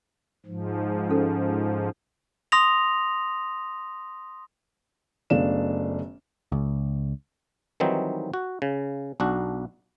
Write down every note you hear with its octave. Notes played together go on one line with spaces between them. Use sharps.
G#2 F3
C#4 A4 B4
C6 D#6 A#6 F7
F#1 A3 B3 D4 F5 E7
C#2
D#3 E3 F#3 G3 C4 D#4
F#4
C#3
B1 D4 F#4